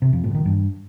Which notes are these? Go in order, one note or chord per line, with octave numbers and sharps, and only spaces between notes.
C3
F2
A2
D#3
G2